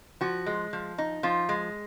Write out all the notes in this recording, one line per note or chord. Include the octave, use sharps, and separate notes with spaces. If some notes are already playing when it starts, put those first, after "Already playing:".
F3 F#4
G#3
F3
D#4
F3 F4
G#3